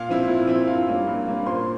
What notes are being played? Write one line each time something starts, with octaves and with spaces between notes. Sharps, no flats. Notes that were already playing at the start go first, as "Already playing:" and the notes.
Already playing: A#2 F4 F5
F3 C4 E4
A#2
F3 C4 E4
G2 F4 F5
G3 A#3 C#4
G2
G3 A#3 C#4
A#2 C5 C6